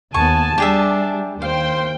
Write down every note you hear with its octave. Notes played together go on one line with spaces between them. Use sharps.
D#2 B3 G#5 A5 C#6
G3 D4 G4 G#4 E5
D#2 C5 F5 G5 C6